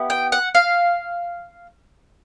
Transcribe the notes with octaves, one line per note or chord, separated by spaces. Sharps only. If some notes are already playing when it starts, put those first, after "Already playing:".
Already playing: B3 E4 G4
G5
F#5
F5